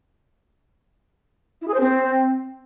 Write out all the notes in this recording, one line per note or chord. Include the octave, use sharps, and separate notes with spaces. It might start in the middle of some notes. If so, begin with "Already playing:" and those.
E4
G#4
C5
C4